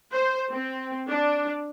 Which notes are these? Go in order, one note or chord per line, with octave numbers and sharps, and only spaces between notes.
C5
C4
D4